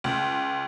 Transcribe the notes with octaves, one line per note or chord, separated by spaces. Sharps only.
C#2